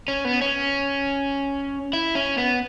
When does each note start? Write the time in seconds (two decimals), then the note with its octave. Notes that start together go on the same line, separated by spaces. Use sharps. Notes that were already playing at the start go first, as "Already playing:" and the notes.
0.08 C#4
0.25 B3
0.41 C#4
1.93 E4
2.15 C#4
2.38 B3